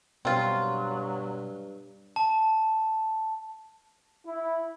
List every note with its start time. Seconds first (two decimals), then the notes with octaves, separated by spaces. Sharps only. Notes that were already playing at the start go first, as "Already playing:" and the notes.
0.25 G2 B2 F#3 C4 F4
2.16 A5
4.27 E4